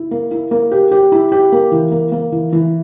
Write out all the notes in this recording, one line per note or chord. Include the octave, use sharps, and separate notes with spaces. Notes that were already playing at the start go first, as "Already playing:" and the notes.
Already playing: E4
A#3
E4
A#3
G4
G4
E4
G4
A#3
E3
A#3
A#3
E3
E3